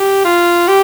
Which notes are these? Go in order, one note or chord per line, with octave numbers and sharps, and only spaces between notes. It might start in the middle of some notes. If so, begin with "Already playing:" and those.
Already playing: G4
F4
G4